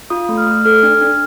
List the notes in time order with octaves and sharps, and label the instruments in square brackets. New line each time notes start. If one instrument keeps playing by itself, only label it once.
[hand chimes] F4 D#6
A3
F6
A3
A4 F6
D4
D4